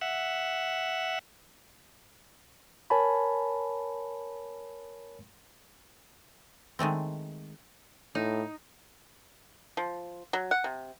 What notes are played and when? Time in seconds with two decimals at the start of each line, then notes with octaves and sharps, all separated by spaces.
0.01 E5 F#5
2.90 A#4 C#5 G#5 A5 B5
6.79 D#3 G#3 A3 C4
8.15 A2 D#4
9.77 F3
10.33 F#3
10.51 F#5
10.64 C3